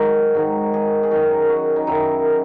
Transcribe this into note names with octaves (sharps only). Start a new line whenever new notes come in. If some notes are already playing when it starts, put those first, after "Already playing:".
Already playing: G#2 D#3 F#3 E4 F#4 G#4
G#2 D#3 F#3 F#4
G#4
G#4
F#2 D#3 F#3 F#4
F#4
D#4
F#2 D#3 F#3 E4